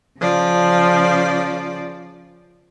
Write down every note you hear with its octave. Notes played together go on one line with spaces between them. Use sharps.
C#3 F3 D5